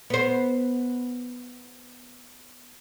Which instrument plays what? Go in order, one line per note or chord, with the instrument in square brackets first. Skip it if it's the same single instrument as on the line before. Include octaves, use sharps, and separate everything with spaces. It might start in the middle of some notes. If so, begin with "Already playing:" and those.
[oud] B3 C5